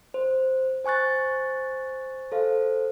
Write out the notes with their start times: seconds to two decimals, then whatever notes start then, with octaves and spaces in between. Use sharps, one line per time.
0.14 C5
0.85 C5 G#5 C#6 F#6 A6
2.32 A4 C5 F5